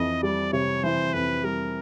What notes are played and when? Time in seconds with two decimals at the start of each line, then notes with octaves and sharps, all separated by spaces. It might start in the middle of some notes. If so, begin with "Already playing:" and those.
Already playing: F2 E3 D#5
0.23 G3 D5
0.53 C3 C#5
0.84 E3 C5
1.13 F2 B4
1.44 G3 A#4